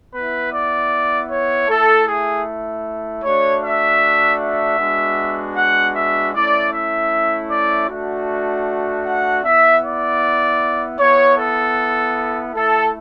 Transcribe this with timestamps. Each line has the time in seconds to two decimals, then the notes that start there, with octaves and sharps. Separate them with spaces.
0.13 B3 E4 B4
0.53 D5
1.30 C#5
1.68 A3 E4 A4
2.07 G#4
3.24 A3 D4 F#4 C#5
3.63 E5
4.40 E5
4.78 G#3 B3 D4 F#4
5.56 F#5
5.95 E5
6.34 A3 C#4 E4 D5
6.73 E5
7.50 D5
7.89 A3 D4 F#4
9.05 F#5
9.44 B3 E4 E5
9.83 D5
10.99 B3 E4 C#5
11.37 A4
12.54 A3 E4 A4